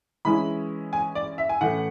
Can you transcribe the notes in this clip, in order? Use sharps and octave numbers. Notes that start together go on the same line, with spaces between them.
E3 G#3 C#4 E4 B5
G#5
D5
E5
G#5
A2 E3 A3 C#4 F#5